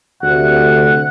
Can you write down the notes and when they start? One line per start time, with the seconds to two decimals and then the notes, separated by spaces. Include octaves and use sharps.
0.23 D2 C3 F#5